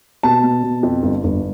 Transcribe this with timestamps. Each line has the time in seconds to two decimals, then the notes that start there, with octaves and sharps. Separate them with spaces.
0.23 B2 A5
0.43 B2
0.63 B2
0.83 F2
1.03 G1
1.24 G1